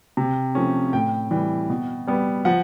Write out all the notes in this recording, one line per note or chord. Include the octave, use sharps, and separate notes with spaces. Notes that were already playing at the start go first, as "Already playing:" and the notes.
C3
F3 A3 C#4
A2 G5
E3 G3
B2
G3 B3
F3 F#5